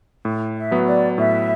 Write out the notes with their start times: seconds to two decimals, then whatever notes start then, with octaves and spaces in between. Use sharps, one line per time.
0.25 A2
0.56 E5
0.71 F#3 B3
0.87 D5
1.18 A2 E5